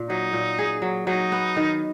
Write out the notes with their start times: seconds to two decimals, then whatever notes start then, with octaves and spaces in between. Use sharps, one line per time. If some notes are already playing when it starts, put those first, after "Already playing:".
Already playing: A#2
0.09 F#3 D#4
0.33 A#2
0.59 G#4
0.82 F#3
1.07 F#3 D#4
1.32 B3
1.56 D#3